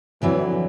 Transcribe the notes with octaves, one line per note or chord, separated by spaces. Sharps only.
F2 D3 E3 F#3 B3